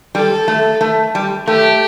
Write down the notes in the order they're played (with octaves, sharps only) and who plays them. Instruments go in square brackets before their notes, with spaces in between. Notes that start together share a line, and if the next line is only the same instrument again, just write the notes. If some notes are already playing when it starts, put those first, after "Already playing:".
[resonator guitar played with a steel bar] G3 [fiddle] A4
[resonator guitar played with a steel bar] A3
A3
G3
[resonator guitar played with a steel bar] A3 [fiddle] G4